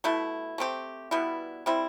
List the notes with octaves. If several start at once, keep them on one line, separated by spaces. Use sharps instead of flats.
B2 A3 E4
A3 C4 G4
B2 G3 B3 E4
G3 C4 E4